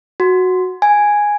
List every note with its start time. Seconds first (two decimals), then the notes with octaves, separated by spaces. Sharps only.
0.20 F#4
0.82 G#5